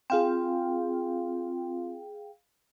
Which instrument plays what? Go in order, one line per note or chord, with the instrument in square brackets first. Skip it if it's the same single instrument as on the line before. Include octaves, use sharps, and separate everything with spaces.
[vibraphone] C4 F4 [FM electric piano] G#4 F5 G5